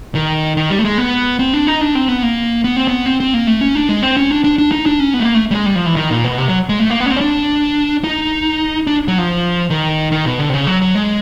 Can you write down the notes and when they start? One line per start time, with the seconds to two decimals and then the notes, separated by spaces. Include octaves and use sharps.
0.15 D#3
0.57 D#3
0.70 G3
0.79 A3
0.85 G#3
0.98 B3
1.39 C4
1.54 D4
1.67 D#4
1.81 D4
1.95 C4
2.09 B3
2.23 A#3
2.64 B3
2.76 C4
2.88 B3
3.06 C4
3.20 C4
3.34 A#3
3.47 A3
3.61 C#4
3.75 D4
3.89 G#3
4.02 C4
4.17 C#4
4.30 D4
4.44 D4
4.58 D4
4.72 D#4
4.86 D4
5.00 C#4
5.14 B3
5.20 A3
5.24 A#3
5.35 A3
5.51 G3
5.55 G#3
5.66 G3
5.75 F3
5.86 E3
5.96 D#3
6.11 A#2
6.24 B2
6.38 C3
6.48 F#3
6.69 G#3
6.79 A3
6.90 A#3
7.00 B3
7.06 C#4
7.11 C4
7.16 C#4
7.21 D4
8.04 D#4
8.87 D4
9.08 F#3
9.18 F3
9.70 D#3
10.12 D#3
10.25 B2
10.39 D3
10.49 C3
10.53 C#3
10.67 F#3
10.82 F#3
10.95 G#3